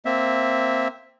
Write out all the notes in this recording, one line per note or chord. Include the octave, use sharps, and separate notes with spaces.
A#3 C4 E5